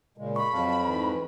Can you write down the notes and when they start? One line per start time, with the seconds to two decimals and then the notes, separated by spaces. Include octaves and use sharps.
0.18 A#2 C#3 G#3
0.36 B5 C#6
0.53 F2 F#3 F5 A5
0.85 G#2 E3 B4